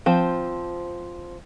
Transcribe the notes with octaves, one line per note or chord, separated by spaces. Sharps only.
F3 C4